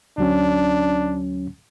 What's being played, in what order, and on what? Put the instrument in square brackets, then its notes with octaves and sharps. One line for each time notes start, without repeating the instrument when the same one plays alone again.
[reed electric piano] D2 F#3 C#4 [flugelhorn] D4